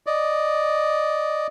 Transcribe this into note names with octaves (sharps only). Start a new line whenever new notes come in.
D5 D#5